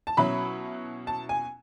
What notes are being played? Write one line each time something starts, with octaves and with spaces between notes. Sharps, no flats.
A5
B2 F#3 C#4 E4 B5
A5
G#5